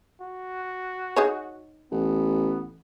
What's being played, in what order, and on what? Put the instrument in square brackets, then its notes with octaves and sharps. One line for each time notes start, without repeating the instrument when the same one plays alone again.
[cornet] F#4
[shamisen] D#4 G#4 C#5
[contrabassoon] A1 [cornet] B3